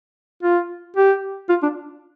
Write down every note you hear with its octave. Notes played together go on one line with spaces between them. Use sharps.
F4
G4
F4
D4